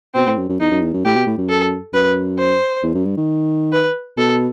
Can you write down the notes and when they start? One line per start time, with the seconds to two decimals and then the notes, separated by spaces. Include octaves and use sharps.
0.15 B2 C4
0.27 A2
0.38 F#2
0.49 F#2
0.60 E2 D#4
0.71 F#2
0.82 E2
0.94 F#2
1.05 A2 G4
1.16 B2
1.26 A2
1.38 F#2
1.49 A4
1.94 F#2 B4
2.38 C5
2.83 E2
2.95 F#2
3.06 G2
3.17 D#3
3.73 B4
4.17 B2 A4